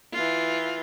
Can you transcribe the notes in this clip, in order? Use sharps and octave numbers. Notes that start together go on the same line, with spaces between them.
E3 F4